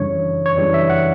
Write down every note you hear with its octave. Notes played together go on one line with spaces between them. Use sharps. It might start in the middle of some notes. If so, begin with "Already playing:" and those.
Already playing: F#2 C#3 E3 G3 D4 C#5
C#5
F#2 C#3 E3 G3 D4 D5
E5
F#5